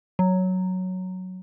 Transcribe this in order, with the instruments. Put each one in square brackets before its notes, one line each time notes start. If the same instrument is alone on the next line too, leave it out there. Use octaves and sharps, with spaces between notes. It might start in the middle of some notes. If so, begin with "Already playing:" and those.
[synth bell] F#3